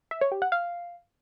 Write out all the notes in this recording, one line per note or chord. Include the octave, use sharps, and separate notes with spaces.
E5
C#5
G4
F#5
F5